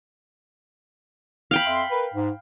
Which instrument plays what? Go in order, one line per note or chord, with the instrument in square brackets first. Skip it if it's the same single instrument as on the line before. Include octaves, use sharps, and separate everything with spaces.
[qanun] F5 G5 B5
[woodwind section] F2 E5 C6
A#4 B4
G#2